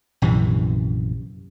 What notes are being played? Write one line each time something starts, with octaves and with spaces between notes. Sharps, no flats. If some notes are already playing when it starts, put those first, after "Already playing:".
A#1 F#2 C3 E3